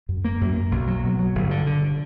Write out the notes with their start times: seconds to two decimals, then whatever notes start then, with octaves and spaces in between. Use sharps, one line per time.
0.09 F#2
0.25 A#3
0.41 F#2
0.56 A#3
0.72 B1
0.87 F#3
1.04 B2
1.19 F#3
1.35 G1
1.51 D3
1.66 D3